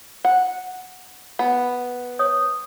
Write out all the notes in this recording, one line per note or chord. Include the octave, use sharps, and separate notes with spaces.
F#5
B3
C#5 D#6